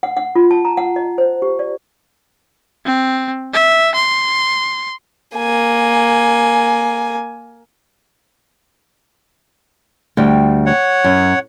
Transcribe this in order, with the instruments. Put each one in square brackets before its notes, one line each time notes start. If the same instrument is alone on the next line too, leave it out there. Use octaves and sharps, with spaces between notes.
[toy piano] F#5
F#5
F4
A5
A#5
F#5
D#5
C5
G4
D5
[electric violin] C4
E5
C6
[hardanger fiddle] A#3 G#5
[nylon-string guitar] D2 G3 G5
[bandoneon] C#5 F#5
[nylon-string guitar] F#2